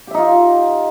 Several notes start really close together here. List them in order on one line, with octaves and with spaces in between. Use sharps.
G4 E5 D#4 F4